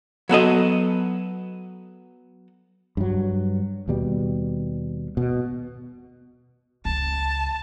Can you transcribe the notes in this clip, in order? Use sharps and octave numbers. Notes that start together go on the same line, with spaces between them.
F#3 B3 A4 D#5
G2 F#3
D#2 B2 G3
B2
C#2 C#3 A5